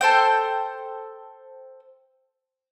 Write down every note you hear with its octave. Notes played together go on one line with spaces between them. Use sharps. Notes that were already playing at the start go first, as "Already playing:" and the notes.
A4 C5 G5